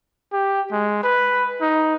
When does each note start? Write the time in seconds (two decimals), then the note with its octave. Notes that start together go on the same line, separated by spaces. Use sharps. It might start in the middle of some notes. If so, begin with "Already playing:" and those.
0.32 G4
0.72 G#3
1.03 B4
1.61 D#4